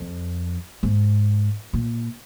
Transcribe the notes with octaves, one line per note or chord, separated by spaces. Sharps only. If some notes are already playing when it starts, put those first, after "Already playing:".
Already playing: F2
G#2
A#2